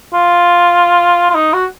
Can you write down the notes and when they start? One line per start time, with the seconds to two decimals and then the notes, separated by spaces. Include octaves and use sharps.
0.14 F4
1.30 F4
1.34 D#4
1.53 F#4